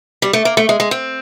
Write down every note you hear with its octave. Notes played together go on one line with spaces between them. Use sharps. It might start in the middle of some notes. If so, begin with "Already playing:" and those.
G3
A3
A#3
A3
G#3
G#3
C4